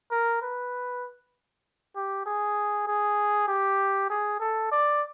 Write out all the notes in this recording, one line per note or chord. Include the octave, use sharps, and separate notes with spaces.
A#4
B4
G4
G#4
G#4
G4
G#4
A4
D5